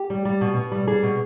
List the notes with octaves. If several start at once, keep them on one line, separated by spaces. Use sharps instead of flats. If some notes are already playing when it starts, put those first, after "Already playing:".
Already playing: G4
G3
G3
B2
B2
G3
G3 G#4
B2